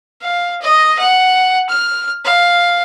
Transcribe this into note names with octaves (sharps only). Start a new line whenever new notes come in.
F5
D#5
F#5
F6
F5